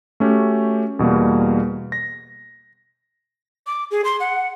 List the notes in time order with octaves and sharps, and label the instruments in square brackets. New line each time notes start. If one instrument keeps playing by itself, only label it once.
[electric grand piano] A3 C#4 F#4 G4
E2 B2 G3 A#3
A#6
[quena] D6
G#4
C6
F#5